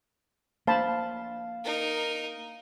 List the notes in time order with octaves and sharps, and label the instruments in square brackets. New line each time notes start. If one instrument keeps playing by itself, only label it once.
[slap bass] A#3 D4 [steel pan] C5 A5 B5 [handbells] F5
[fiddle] D#4 A#4